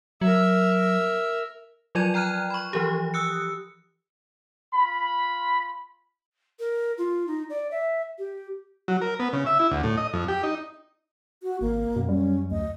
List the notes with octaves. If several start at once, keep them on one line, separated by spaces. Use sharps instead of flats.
F#3 A#4 E5
F3 F#3 F4 D5 G#6 D#7
G5 A#5 F6 F#6
B5 C#6
E3 F3 G4
D#6 E6 F#6 C#7
F4 B5
A#4
F4
D#4
D5
E5
G4
F#3
A#4
B3
C#3
E5
E4
D2
A2
D#5
F2
G4
D#4
F#4
G#1 A#3
F#2 B2
G3 C#4
D2 D#5